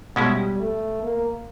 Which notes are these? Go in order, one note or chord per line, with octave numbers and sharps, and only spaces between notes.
B2 G3 G#3 C#4 E4
A3
A#3